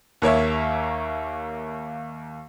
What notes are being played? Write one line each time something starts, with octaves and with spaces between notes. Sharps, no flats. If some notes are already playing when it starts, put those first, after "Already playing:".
D#2 A#3 C#5 E5